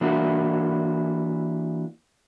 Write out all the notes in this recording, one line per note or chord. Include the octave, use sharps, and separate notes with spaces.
E3 A#3 D4 E4 F#4